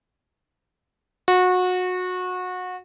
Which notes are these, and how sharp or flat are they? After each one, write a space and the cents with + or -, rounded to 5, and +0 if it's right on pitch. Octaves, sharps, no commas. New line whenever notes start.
F#4 -25